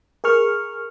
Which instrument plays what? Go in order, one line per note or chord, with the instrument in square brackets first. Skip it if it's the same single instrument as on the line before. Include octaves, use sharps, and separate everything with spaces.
[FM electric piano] G#4 A#4 C#6 F6